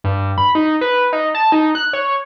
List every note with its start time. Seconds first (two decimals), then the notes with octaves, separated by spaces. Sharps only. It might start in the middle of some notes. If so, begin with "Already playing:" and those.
0.04 G2
0.38 B5
0.55 D#4
0.81 B4
1.13 D#4
1.35 A5
1.52 D#4
1.75 F#6
1.93 C#5